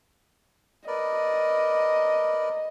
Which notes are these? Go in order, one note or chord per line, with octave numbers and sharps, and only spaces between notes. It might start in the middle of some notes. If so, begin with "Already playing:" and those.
A#4 B4 D5 D#5